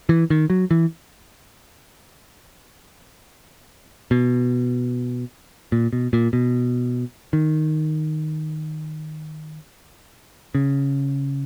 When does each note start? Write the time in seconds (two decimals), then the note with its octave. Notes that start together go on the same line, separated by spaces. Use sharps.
0.09 E3
0.30 D#3
0.50 F#3
0.71 E3
4.11 B2
5.72 A#2
5.93 B2
6.13 A#2
6.33 B2
7.33 D#3
10.55 C#3